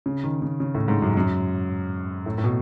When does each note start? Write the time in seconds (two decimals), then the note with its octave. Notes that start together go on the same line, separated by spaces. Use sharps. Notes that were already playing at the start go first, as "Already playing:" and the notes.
0.06 C#3
0.24 D#3
0.42 C#3
0.60 C#3
0.75 A2
0.88 G#2
1.02 F#2
1.17 F#2
2.26 A2
2.38 A2
2.44 B2